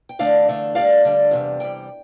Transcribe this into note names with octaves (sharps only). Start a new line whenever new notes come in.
G5
E2 D3 A3 D4 D5 F5
E2 D3 A3 D4
D2 D3 G3 D5 F5
D2 D3 G3
E2 C3 G3
E2 C3 G3 G5